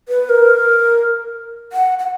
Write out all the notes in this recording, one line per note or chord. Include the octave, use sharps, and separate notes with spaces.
B4
A#4
F#5
F#5